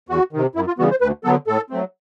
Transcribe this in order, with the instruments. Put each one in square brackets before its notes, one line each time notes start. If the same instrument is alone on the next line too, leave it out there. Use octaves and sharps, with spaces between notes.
[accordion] E2 F#4
C3 D#3
F#2 E4
F4
C#3 E3 G3 B3 F#4
C5
D2 B4
D3 F#3 B3 A4
A2 A4
F#3 A3 C4